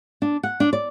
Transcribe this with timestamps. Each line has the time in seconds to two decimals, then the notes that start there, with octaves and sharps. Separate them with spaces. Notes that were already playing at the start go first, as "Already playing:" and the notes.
0.22 D4
0.43 F#5
0.60 D4
0.73 D5